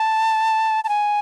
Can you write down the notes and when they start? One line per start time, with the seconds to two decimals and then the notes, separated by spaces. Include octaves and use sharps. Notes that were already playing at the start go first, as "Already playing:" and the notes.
Already playing: A5
0.84 A5
0.89 G#5